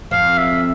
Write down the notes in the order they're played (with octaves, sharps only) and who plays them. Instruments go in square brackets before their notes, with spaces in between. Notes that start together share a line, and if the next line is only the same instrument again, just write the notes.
[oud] F2 [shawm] F5
[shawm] E5